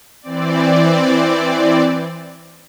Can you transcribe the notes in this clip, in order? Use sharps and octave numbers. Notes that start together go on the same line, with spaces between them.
E3 C4 D5